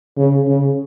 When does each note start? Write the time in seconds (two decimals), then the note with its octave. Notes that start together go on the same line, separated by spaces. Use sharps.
0.17 C#3
0.48 C#3